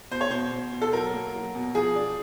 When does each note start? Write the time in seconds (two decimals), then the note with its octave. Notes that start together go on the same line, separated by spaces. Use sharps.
0.11 B2 C5
0.21 C#5
0.31 B2 C5
0.52 B2
0.72 B2
0.82 A4
0.93 F#3 A#4
1.14 A#3
1.34 F#3
1.55 B2
1.75 F3 G#4
1.96 D4